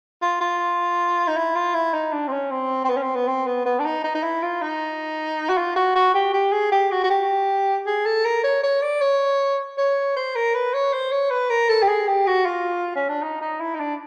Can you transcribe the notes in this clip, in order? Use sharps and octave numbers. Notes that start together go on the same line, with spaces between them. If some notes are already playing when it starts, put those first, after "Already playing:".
F4
F4
D#4
E4
F4
E4
D#4
D4
C4
C#4
C4
C4
B3
C#4
C4
B3
C4
B3
B3
D4
D#4
D#4
D#4
E4
F4
D#4
F#4
F4
F#4
F#4
G4
G4
G#4
G4
F#4
F#4
G4
G#4
A4
A#4
C#5
C#5
D5
C#5
C#5
C5
A#4
B4
C#5
C5
C#5
B4
A#4
A4
G4
G#4
G4
F#4
F4
C#4
D4
D#4
D#4
E4
D#4
D4